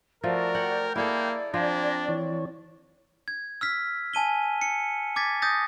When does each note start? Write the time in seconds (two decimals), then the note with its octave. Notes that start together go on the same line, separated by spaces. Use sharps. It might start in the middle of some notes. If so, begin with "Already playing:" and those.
0.24 F3 A3 F#4 A#4 D5 A5
0.55 F#5 G5
0.96 A#3 E4 G#4 A4 D5
1.54 F3 C4 D4 G#5 A#5
2.09 E3 C#5
3.28 G#6
3.61 E6 F6 B6
4.13 G#5 A5 D#7 G7
4.61 C#7
5.16 D6 G#6 A6 B6
5.42 D#6 G6 A6 A#6